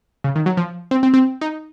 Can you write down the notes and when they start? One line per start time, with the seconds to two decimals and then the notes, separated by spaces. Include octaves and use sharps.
0.24 C#3
0.36 D#3
0.46 F#3
0.57 F3
0.91 C4
1.03 C4
1.14 C4
1.41 D#4